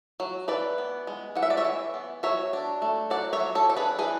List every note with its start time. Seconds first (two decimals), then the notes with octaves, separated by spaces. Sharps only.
0.20 F#3
0.48 E3 B4 D5
0.78 B3
1.07 G#3
1.35 E3 F#5
1.43 E5
1.50 D5
1.57 C#5 E5
1.65 E3
1.94 B3
2.23 F#3 C#5 E5
2.53 D4
2.82 A3
3.10 F#3 D5 F#5
3.33 C#5 E5
3.40 F#3
3.55 A4 C#5
3.70 D4 A4
3.77 G#4 B4
3.99 E3 G#4 B4